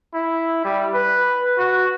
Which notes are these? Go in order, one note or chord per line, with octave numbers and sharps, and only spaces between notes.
E4
G3
B4
F#4